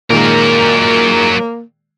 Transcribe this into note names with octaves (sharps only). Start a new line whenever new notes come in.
A#2 D#3 F#3 G#3 A#3 A#4